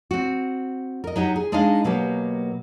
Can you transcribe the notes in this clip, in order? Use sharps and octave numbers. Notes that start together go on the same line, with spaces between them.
C4 F#4
A#4 D#5
F#3 D#4 F#4 G4
G#4
G#3 D4 D#4 G#4 D#5 F5
B2 F#3 A#3 G4